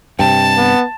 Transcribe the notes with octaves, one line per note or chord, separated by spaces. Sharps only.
G2 C3 G5 A5
B3